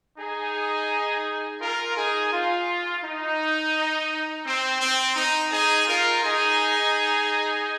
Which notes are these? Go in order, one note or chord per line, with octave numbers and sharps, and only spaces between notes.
D#4 G#4
F4 A#4
D#4 G#4
F4
D#4
C4
C4
D#4
D#4 G#4
F4 A#4
D#4 G#4